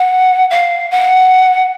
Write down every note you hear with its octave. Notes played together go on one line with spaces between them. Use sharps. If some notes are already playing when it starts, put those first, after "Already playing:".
Already playing: F#5
F5
F#5